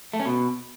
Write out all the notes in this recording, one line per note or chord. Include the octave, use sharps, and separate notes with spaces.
A3
C#4
B2